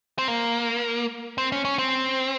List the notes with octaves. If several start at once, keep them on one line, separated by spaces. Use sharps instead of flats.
C4
A#3
C4
C#4
C#4
C4